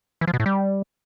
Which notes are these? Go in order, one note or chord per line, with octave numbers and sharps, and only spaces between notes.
E3
F3
B2
A2
G3